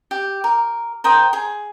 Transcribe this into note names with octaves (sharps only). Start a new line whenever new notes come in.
G4
A#4
A#4 C5 G5 D#6
G#4